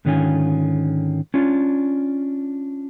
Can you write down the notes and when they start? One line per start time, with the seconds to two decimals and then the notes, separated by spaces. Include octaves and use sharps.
0.05 G#2 D3 D#3 C#4 F4 G#5
1.34 C#4 D4 F4